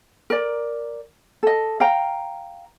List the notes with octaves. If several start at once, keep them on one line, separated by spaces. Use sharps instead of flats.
A#4 D5
A4 D#5
F5 G5 A#5